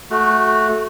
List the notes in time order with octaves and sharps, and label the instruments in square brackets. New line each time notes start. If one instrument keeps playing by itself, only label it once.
[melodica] A3 F#4